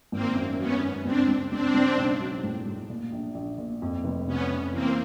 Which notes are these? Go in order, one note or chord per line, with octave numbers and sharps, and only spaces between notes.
G#1 A#3 C4
F#2
F#3 B3 C#4
F#2
C#2 C4 D4
C#2
C#2 C4 D4
C#2
B1
F#3
A2
A2
A#2
A#1
A#1
A#2
F2
F1
C3 B3 C#4
C3
E3 A#3 C4